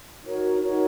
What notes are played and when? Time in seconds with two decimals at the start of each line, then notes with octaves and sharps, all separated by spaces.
0.23 D#4 F#4 A#4 C#5
0.60 D#4 F#4 A#4 C#5